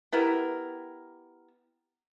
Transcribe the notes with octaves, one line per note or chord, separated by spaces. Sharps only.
B3 E4 G4 A#4